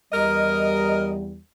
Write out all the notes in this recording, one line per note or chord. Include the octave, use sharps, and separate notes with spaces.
E2 G3 A#4 D#5